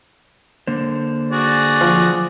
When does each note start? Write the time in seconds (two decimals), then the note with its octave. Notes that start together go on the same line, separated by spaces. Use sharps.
0.67 D3 A#3 C5
1.31 F#4 G#4 D5
1.81 F3